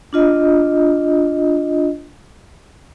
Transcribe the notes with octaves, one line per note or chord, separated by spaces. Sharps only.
D4 F4 D#5